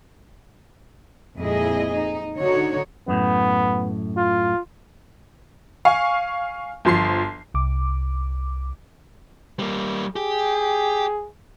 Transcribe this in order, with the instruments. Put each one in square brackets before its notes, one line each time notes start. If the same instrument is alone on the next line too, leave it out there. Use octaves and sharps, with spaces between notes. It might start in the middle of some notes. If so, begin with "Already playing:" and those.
[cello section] F2 A#2 G#3 E4 G#4 D#5
D#4
D3 D#4 F#4 C#5
[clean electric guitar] F#2 A2 [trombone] B3
[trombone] F4
[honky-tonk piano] F5 G#5 C#6
G1 F3 C6 C7
[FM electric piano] C2 D6
[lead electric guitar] G3 A#3
[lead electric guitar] G4 [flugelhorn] G#4